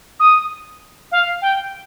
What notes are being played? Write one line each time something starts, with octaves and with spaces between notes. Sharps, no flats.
D#6
F5
G5